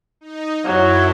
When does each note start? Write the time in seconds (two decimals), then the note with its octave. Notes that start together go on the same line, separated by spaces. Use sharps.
0.21 D#4
0.66 F#2 F#3 E4